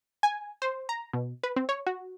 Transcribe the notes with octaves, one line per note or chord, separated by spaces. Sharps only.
G#5
C5
A#5
B2
B4
C4
C#5
F#4